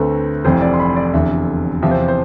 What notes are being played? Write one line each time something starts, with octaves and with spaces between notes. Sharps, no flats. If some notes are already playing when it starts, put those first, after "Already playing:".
Already playing: D2 D3 A3 C4 B4
F1 F2 E3 C5
D5
C6
B5
D5
F1 E2 D3 E5
E2 C3 F3 E5
C5
C5